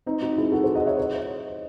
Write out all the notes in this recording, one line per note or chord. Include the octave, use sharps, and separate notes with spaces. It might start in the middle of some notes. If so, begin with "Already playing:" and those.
C4 D#4
D#4 F#4
E4 G#4
F#4 A4
G#4 C5
D#5 F#5
C#5 E5
C5 D#5